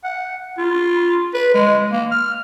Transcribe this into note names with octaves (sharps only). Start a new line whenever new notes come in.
F#5
F4
B4
G#3
A#3
F6